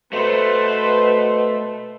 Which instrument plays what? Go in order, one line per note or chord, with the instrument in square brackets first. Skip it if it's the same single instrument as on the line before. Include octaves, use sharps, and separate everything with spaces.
[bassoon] B2 [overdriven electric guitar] A3 [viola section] B4 C5